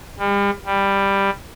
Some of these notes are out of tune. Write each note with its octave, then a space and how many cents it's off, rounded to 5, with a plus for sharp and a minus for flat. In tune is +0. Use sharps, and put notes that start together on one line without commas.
G3 +40
G3 +10